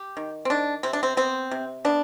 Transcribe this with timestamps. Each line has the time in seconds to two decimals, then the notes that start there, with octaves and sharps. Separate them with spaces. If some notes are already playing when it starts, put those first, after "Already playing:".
Already playing: G4
0.17 D#3
0.45 C4
0.50 D#3 D4
0.83 C3 C4
0.93 D4
1.03 C4
1.17 B3 C4
1.51 C3
1.85 B3 D4